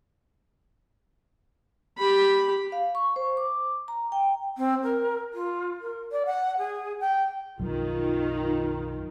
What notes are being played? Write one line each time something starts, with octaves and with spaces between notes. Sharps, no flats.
G4 B5
F5
C#6
C5
D6
A#5
G5
C4
A#4
F4
A#4
D5
F#5
G#4
G5
B1 F#2 D#3 F3 F4